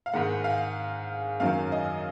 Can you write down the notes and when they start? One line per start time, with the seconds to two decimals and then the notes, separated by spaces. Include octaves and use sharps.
0.06 F5
0.13 G#2 D#3 G#3 F#5
0.44 F5
1.40 F#2 D#3 F#3 F5
1.72 D#5